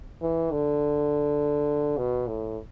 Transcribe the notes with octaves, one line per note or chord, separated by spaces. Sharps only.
E3
D3
B2
A2